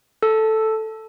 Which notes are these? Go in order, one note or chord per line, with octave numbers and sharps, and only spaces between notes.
A4